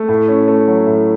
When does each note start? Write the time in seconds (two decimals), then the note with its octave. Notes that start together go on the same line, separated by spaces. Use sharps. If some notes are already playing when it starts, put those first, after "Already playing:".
Already playing: A3
0.08 A2
0.28 C#4
0.48 A3
0.68 F#3
0.87 A2